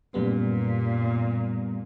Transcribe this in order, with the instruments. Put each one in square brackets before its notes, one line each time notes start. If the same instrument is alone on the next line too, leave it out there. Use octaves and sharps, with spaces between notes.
[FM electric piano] F#2 G3 B3 [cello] A#2